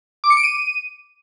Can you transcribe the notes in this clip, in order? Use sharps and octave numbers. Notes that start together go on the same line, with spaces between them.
D6
C#7
D7
D#7